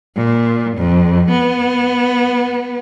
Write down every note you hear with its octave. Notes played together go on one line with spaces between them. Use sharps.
A#2
F2
B3